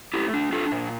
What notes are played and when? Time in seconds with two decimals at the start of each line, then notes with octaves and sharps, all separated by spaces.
0.14 A3 E4 G4
0.34 D4
0.52 D4 F4 A4
0.72 A#2